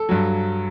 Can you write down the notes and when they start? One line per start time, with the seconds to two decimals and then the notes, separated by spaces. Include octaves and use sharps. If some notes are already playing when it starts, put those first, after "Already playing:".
Already playing: A4
0.09 G2 F#3